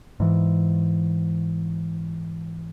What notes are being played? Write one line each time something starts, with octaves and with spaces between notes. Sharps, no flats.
G#2 E3